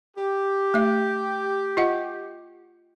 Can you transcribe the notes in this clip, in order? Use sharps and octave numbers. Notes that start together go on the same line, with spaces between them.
G4
A3 E5
F4 D#5 F#5